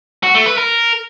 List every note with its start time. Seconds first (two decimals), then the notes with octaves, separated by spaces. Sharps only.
0.23 F#4
0.35 A3
0.46 B4
0.57 A#4